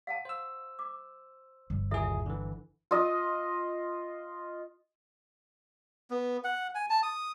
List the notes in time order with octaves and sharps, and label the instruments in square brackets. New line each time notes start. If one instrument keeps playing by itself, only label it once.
[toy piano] F5 F#5 A5
[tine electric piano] C5 E6
[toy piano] D6
[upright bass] G1
[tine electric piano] D#2 A#2 G#4 [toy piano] E4 A4 E5
[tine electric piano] D3 E3
[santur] F4 D#5
[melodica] B3
F#5
G#5
A5
D#6